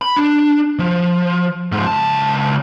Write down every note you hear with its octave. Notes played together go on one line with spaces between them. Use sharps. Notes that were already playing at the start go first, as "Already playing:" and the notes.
B5
D4
F3
G#2 F3
C#2 A5